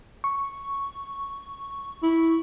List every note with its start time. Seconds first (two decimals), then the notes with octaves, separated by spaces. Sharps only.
0.24 C#6
2.03 E4